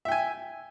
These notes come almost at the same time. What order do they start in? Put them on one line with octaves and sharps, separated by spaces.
E5 G5 G#5